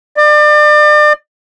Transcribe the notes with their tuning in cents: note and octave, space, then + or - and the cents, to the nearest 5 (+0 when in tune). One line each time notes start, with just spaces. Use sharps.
D5 +35